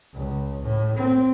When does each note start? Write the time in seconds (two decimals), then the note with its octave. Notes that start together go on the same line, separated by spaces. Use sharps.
0.13 C#2
0.63 A2
0.97 C4